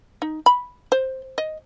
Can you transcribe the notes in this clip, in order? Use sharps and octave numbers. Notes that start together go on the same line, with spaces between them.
D#4
B5
C5
D#5